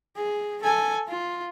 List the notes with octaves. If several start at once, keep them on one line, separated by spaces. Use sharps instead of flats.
G#4
A4 G#5
F4